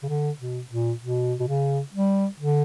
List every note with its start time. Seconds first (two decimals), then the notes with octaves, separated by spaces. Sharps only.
0.03 C#3
0.09 D3
0.39 B2
0.71 A#2
1.01 B2
1.40 B2
1.48 C#3
1.94 G3
2.40 D3